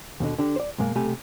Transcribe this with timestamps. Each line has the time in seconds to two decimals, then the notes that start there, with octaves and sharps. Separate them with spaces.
0.20 D#2 B2 D3 D#5
0.38 D3 D4 G4
0.56 C5 D5
0.78 F#2 B2 G#3 A#3
0.95 B1 C3 A3 G4 G#5 B5